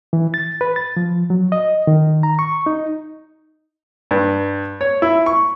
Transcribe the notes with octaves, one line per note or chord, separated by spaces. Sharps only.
E3
A6
B4
A6
F3
F#3
D#5
D#3
A#5
C#6
D#4
G2
C#5
E4
C#6